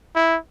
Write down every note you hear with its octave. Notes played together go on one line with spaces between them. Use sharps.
E4